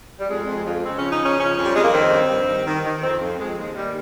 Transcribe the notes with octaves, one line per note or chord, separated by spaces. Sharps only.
G3
F2 G#3
F2
F2
C#3 C4
C#4
F3
D#4
C#3
C#4
F3 C#4
F2
G3
F2 G#3
A#3
D#3 C4
G2
G2
D#3
D#3
D#3
F2 C4
F2
F2 G#3
D#2 G#3
D#3 G3